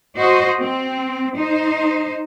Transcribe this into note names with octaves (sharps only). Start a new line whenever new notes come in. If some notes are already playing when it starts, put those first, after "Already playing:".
F#4 C5 D#5
C4
D#4 C5